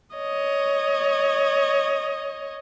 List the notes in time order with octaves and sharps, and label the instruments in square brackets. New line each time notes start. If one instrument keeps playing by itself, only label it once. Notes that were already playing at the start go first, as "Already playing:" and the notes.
[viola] C#5 D#5